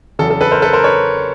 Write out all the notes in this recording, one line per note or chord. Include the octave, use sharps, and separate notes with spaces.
E2 C#3 F#3 A4
A4
A4 B4
A#4 C5
A4 B4
A#4 C5
B4 C#5